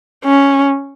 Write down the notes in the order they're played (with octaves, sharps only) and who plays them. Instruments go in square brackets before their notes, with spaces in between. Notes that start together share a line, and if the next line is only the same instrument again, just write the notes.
[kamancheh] C#4